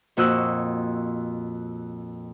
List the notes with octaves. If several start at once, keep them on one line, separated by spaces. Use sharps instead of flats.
F2 A#2 F#4 D#5 E6 F#6